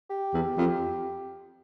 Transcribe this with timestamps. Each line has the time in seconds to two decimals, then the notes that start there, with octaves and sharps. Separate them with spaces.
0.10 G4
0.34 E2
0.58 F2